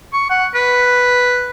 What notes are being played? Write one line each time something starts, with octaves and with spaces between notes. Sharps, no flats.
C#6
F#5
B4